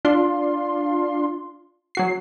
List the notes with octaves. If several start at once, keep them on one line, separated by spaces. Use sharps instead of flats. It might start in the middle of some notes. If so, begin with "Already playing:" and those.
D4 F4 C6
F#3 F#4 C7